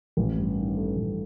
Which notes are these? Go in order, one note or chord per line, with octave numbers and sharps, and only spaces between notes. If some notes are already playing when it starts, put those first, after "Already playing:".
A1
G2
D#3
A3
A1